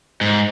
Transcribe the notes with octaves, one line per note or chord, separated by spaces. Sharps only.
G#2